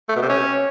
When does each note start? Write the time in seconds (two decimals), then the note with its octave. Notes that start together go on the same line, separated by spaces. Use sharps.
0.09 A3
0.16 B2
0.22 C3
0.29 C#4